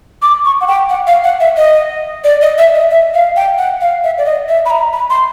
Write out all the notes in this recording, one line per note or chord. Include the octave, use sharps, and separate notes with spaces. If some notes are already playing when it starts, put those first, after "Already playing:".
D6
C#6
F#5
G5
F#5
F5
F#5
E5
D#5
D5
D#5
E5
D#5
E5
F5
G5
F#5
F5
E5
D5
D#5
E5
B5
A#5
B5
C6